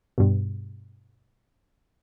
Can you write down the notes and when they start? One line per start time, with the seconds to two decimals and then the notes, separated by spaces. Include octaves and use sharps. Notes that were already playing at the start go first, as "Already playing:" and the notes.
0.18 G2 B2